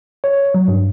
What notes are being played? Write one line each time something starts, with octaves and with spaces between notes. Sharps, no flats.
C#5
F#3
G2